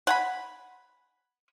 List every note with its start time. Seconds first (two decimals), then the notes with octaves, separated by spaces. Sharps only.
0.07 F#5 G#5 B5